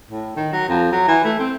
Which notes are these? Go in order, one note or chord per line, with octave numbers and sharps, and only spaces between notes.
A2
D#3
F#3
F2
F#3
E3
A3
C4